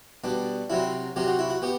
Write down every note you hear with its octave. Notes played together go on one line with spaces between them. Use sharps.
B2 G3 D4
C3 F#3 C4 E4
C3 F#3 C4 G4
F#4
E4
F#4
B3 G4